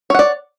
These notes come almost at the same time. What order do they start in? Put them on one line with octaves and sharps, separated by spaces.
C#5 F#5 D5